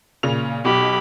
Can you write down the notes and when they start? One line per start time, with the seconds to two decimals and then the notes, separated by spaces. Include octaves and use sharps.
0.23 A#2 C#3 F7
0.65 B1 B2 G4 B5